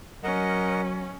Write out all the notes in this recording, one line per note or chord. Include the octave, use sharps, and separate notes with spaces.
F#3 C#4 A#4 D#5 F#5